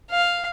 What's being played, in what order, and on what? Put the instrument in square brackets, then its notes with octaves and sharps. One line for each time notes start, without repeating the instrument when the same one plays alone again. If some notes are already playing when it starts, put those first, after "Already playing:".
[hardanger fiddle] F5